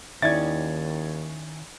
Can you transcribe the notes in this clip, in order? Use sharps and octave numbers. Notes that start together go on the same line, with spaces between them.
D#2 D#3 C#4 E4 D5 E5 G#6 A6